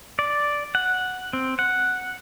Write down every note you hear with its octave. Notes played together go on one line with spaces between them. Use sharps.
D5
F#5
C4
F#5